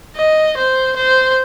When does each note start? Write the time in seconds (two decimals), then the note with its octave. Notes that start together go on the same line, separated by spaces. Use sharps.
0.16 D#5
0.57 C5
0.96 C5